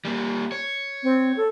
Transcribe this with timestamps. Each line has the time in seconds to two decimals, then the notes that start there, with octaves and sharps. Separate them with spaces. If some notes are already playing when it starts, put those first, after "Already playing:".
0.05 G3 A#3
0.52 C#5
1.03 C4
1.37 A4